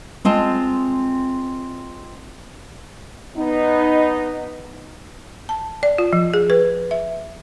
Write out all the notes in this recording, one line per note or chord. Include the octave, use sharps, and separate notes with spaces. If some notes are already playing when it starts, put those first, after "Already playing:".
G#3 C4 F4 A5
B3 D#4
A5
D5
F4
F3
G#4
B4
E5